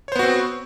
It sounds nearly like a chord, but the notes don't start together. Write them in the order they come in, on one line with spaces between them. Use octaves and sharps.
C#5 C5 B3 F#4 C4